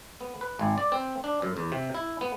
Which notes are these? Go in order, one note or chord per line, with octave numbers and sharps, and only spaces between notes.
B3
B4
G#1
D5
C4
D4
F#2
E2
C3
E4
B3